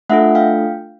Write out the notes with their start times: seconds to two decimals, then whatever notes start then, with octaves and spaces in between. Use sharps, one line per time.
0.10 A3 D4 F4 A4 E5 F#5
0.35 F5 G5